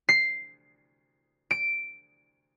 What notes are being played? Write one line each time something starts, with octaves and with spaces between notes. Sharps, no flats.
C7
D7